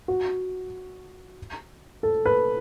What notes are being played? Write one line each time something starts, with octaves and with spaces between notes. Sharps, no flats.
F#4
A4
B4